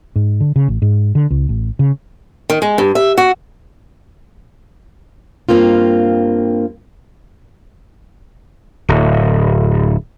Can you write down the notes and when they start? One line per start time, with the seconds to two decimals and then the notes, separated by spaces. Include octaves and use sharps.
0.16 G#2
0.41 D3
0.56 C#3
0.68 A1
0.82 G#2
1.15 D3
1.30 C#2
1.49 A1
1.79 C#3
2.50 D#3
2.62 G#3
2.78 G2
2.95 E5
3.18 F#4
5.49 G2 A#3 C4 F4
8.89 D1